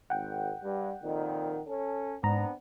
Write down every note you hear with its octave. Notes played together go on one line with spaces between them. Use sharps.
G#1 F#5 G5
G2 G3
F2 A#2 D#3
C#4 A4
G#2 B3 C4 D4 A#5